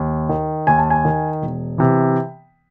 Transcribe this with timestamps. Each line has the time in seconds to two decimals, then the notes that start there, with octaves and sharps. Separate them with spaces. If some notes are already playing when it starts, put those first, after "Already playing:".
Already playing: D#2
0.29 D#3
0.67 D#2 G#5
0.79 A5
0.90 G#5
1.05 D#3
1.42 E1
1.78 C3 E3